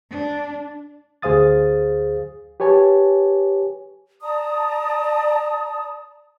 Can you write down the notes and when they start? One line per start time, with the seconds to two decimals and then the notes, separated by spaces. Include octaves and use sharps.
0.11 D4
1.22 D2 G#4 C5 F5 D#6 A6
2.60 G4 B4 C#5 G#5 A5
4.22 D5 A5 A#5 D#6